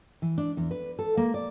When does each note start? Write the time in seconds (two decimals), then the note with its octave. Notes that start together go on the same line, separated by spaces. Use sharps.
0.22 E3
0.38 D4
0.57 E2
0.71 B4
0.99 A4
1.17 A#3
1.34 D5